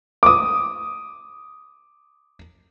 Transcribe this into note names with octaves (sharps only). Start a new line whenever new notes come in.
D6 D#6